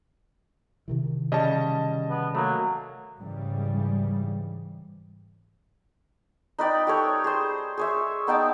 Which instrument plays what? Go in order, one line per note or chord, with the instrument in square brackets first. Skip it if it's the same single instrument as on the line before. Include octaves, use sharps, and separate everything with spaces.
[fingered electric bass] C3 D#3 E3
[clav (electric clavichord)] C#3 G3 C#4 [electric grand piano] D#5 A5
[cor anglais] B3
[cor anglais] F#3 [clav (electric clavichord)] A3 A#3
[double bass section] G#2 C#3 E3 G3
[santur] D#4 B4 D5 G5
G4 A4 C#5
G#4 C5
G#4 C#5 E5
B3 D#4 G5 A5